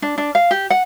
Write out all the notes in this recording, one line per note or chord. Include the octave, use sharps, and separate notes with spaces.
D4
D4
F5
G4
F#5